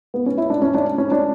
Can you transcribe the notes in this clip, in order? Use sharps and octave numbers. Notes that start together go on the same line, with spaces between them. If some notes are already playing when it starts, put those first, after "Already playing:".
B3
C#4
E4
D4
C#4
D4
C#4
D4